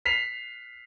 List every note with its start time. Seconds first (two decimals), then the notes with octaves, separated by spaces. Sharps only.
0.06 B6 C7 F7